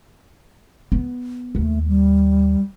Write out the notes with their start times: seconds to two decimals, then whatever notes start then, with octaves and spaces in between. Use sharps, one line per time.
0.92 B3
1.55 D#2 A3
1.88 G3